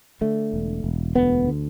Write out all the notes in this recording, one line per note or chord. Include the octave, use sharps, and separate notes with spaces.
D3 A3
E1
E1
D2 B3
D3